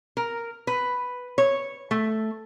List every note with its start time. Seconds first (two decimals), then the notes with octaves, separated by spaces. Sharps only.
0.17 A#4
0.67 B4
1.38 C#5
1.91 A3